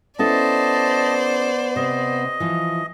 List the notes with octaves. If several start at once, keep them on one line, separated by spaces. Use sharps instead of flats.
B3 C#4 E4 A4 C5 D5 D#5 A5
C3 D#5
E3 F3